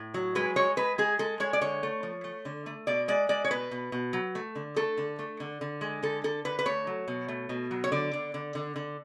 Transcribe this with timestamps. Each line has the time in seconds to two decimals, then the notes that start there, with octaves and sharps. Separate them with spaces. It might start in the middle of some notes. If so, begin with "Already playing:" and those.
Already playing: A2
0.14 F#3
0.35 G#3 B4
0.56 G#3 C#5
0.77 G#3 B4
0.98 G#3 G#4
1.19 G#3 A4
1.40 G#3 C#5
1.53 D5
1.61 D3 C#5
1.83 A3
2.03 F3
2.24 A3
2.45 D3
2.66 A3
2.87 B2 D5
3.08 G#3 D5
3.29 G#3 D5
3.44 C#5
3.51 B2 B4
3.71 B2
3.92 B2
4.13 F#3
4.35 A3
4.56 D3
4.76 A3 A4
4.97 D3
5.19 A3
5.40 D3
5.61 D3
5.81 G#3
6.02 D3 A4
6.24 D3 A4
6.45 D3 B4
6.59 B4
6.66 A3 C#5
6.87 F#3
7.08 B2
7.28 A3
7.49 B2
7.71 F#3
7.84 C#5
7.92 D3 D5
8.13 D3
8.34 D3
8.55 D3
8.76 D3